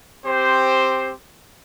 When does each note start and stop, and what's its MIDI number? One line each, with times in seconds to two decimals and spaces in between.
0.24 1.12 60
0.24 1.12 67
0.24 1.12 72